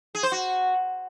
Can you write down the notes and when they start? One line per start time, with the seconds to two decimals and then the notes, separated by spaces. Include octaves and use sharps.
0.15 G#4
0.23 C5
0.32 F#4